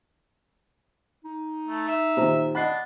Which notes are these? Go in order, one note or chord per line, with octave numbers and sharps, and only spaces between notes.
D#4
A3
E5
A#2 D#3 G4 C5 A#5
D4 D#5 F#5 B5 F#6 C7